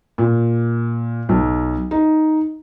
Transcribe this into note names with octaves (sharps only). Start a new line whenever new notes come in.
A#2
B1
D#4